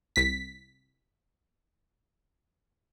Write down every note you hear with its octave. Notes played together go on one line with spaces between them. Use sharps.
C2 B6